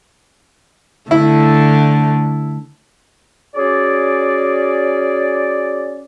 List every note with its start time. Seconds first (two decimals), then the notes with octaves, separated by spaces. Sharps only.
1.11 D3 A3 E4
3.55 C#4 F#4 G#4 D5